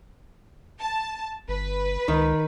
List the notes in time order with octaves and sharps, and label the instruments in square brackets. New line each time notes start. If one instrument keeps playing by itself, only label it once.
[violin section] A5
[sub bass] G1 [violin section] B4
[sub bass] C#2 [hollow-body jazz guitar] D#3